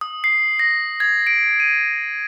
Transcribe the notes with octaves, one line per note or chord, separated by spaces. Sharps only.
D#6
C7
A#6
G#6
D7
D#7